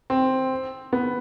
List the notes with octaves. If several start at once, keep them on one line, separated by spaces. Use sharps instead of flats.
C4
B3